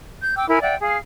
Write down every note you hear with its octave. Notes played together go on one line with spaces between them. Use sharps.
G6
G5 D6 E6
E4 A#4 G#5 B5
D5 E5 F#5 G5
G#4 F5